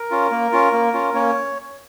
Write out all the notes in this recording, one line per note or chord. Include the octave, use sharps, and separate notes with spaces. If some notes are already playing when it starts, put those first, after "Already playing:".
Already playing: A#4
C#4 F4
A#3
C#4 F4
A#3
C#4 F4
A#3 C#4 C#5